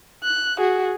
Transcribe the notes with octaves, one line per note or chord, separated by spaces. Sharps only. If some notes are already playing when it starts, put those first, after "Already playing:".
F#6
F#4 G#4